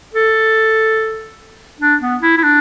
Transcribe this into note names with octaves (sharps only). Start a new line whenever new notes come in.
A4
D4
B3
E4
E4
D4